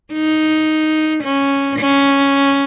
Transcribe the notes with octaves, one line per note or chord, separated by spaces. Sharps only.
D#4
C#4
C#4